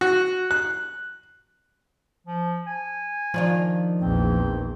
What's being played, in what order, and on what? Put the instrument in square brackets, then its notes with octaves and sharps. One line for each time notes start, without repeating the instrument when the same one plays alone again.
[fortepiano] F#4
F#6
[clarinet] F3
G#5
[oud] D#3 D4 F4 [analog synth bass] F3
[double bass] A#1 E2 [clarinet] C4